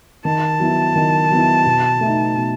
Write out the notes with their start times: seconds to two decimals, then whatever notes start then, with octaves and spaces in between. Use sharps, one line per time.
0.25 D#3 A5
0.60 F#3 B3 E4
0.96 D#3
1.31 F#3 B3 E4
1.65 B2
2.01 A3
2.06 D#4
2.37 B2